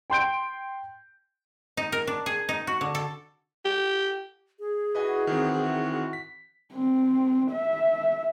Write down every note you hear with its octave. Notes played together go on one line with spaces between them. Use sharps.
G5 C6 G6 D7
D#4
A#4
D4
G#4
D#4
F#4
D3
A4
G4
G#4
E4 F#4 B4 D#5 G#5
D#3 E3 C4
B6
C4
E5